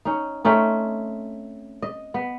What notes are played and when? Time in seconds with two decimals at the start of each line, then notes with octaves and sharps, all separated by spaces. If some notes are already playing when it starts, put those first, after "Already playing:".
0.05 C#4 D#4
0.45 A3 C4 C#4 D#4
1.82 D#5
2.14 B3